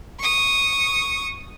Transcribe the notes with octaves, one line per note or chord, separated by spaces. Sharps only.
C#6 D#6